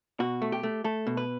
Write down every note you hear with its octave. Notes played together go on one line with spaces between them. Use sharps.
B2 F#4
A3
G4
A3
A3 A4
B2
B4